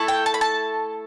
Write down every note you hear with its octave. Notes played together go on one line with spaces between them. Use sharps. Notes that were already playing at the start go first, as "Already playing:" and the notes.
Already playing: A3 E4 A4
G5
A5
B5
A5